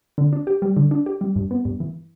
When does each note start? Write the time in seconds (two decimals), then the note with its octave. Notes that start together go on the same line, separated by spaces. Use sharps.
0.18 D3
0.33 D4
0.47 G4
0.62 G3
0.77 D3
0.91 D4
1.06 G4
1.21 G3
1.36 G2
1.51 B3
1.65 G2
1.80 E3